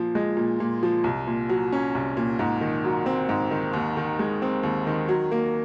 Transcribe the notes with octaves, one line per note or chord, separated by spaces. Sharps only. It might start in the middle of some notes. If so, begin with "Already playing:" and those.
Already playing: A#2 F3
G#3
A#2
A#2
F3
C2
A#2
F#3
C#4
C2
A#2
G#2
D#3
F#3
C4
G#2
D#3
D#2
D#3
G#3
C4
D#2
D#3
F#3
A#3